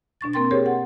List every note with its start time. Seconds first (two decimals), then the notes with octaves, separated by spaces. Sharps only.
0.21 B2 D4 C#6 A6
0.33 A#3 C4 A#4 G5 C6 A6
0.51 G4 G#4 A#4 C5 C#5
0.66 F#5